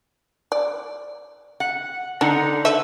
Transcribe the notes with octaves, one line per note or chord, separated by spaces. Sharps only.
D5
F#5
D3 D4 D#4 F#5
A4 B4 E5